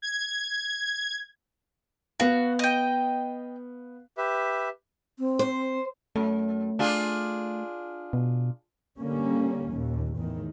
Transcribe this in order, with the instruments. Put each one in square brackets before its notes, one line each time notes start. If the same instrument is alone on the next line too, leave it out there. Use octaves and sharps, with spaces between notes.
[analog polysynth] G#6
[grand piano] B3 F5 [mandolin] F#4
[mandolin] D#5 G5
[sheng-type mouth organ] G4 B4 E5
[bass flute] C4
[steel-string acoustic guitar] C5
[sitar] F#2 [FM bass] A3
[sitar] D4 F4 G#4
[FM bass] B2
[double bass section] D3 G3 A#3 C#4
D#2 A#2
E2 A2 D#3